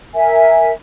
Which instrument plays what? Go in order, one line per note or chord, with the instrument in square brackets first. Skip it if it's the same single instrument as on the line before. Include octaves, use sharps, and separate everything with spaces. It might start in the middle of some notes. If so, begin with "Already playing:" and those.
[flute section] A#4 E5 G#5